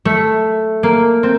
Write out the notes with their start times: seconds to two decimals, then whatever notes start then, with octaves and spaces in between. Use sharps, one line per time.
0.05 A3
0.83 A#3
1.23 C4